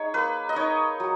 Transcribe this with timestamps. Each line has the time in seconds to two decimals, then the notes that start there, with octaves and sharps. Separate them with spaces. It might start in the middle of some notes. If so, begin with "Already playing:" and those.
Already playing: D#4 G#4 C#5
0.14 A#3 B4
0.49 D#5
0.56 D#4 C#5
1.00 F#3